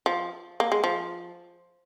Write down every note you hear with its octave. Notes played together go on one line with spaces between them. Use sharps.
F3
A#3
G#3
F3